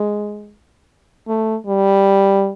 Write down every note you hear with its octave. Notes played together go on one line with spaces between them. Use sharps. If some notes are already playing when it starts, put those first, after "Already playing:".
Already playing: G#3
A3
G3